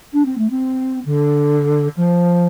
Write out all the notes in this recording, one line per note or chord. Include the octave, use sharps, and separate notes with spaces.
D4
C4
A3
C4
D3
F3